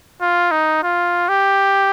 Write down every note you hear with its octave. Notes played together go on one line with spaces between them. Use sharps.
F4
D#4
F4
G4